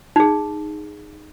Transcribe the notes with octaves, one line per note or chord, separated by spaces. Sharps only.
D#4 G#4